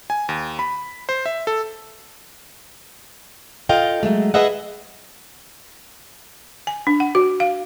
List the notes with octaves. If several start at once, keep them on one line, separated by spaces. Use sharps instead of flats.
G#5
D#2
B5
C5
E5
A4
F4 A4 D#5 F5 G5
F#3 G#3 A3
G#4 B4 D#5 E5 F#5
G#5
D4
F#5
F#4
F5